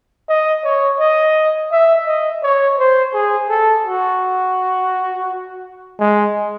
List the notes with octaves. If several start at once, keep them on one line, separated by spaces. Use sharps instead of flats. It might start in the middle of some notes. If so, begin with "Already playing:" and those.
D#5
C#5
D#5
E5
D#5
C#5
C5
G#4
A4
F#4
G#3